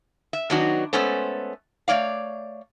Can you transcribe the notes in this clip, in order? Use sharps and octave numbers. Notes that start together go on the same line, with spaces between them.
E5
D#3 F#3 B3 D4 D#4 F#4
G#3 A3 B3 C#4 A4 C5
A3 C#5 D5 F5